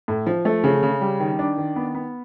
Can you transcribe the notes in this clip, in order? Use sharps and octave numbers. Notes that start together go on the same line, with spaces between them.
A2
F3
A3
C#3
C#3
G3
D#3
D4
D#3
B3
B3